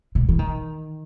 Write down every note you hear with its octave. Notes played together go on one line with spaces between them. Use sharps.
B2
E3
D#3